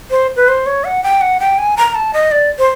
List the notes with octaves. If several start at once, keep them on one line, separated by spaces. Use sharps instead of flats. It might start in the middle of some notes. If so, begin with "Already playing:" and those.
C5
B4
C5
C#5
F#5
G5
F#5
G5
G#5
A#5
A5
D#5
D5
C5